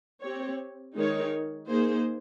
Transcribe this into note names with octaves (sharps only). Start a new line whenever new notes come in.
C4 G4 C#5
D#3 G#3 D#4 A#4 C#5
A#3 D#4 G#4 C5